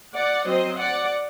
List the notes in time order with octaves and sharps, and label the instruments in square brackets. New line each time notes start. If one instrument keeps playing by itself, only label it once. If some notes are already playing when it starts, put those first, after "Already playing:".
[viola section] D5 F#5
F#3 C4 C5 D#5
D5 F#5